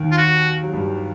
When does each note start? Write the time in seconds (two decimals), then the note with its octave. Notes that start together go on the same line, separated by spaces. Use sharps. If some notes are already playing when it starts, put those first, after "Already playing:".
Already playing: D#2 D#3
0.12 F4
0.17 F#4
0.63 F#3
0.73 G2 G3